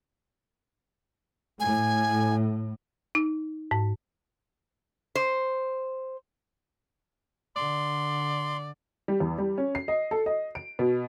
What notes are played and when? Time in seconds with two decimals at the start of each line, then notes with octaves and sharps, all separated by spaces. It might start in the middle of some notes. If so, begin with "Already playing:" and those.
1.60 A2 G#5
3.15 D#4
3.71 G#2
5.15 C5
7.56 D3 D5 C6
9.08 G3
9.20 E2
9.38 G3
9.58 C#4
9.75 C7
9.88 D#5
10.11 A4
10.26 D#5
10.55 D7
10.79 B2